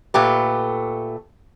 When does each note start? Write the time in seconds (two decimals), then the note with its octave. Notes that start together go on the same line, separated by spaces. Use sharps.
0.14 A#2 A3 G4 B4